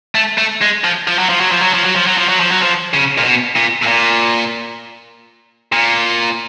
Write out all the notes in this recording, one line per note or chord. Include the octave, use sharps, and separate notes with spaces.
A3
A3
G#3
F3
F3
F#3
F3
F#3
F3
F#3
F3
F#3
F3
F#3
F3
F#3
F3
F#3
F3
C#3
A#2
B2
A#2
A2
A#2
A#2